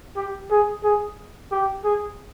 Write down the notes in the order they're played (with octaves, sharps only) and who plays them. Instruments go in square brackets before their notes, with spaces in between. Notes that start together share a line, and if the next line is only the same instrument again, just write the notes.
[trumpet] G4
G#4
G#4
G4
G#4